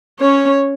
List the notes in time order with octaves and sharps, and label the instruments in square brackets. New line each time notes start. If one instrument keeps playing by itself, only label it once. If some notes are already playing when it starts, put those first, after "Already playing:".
[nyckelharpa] C#4 [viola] C#5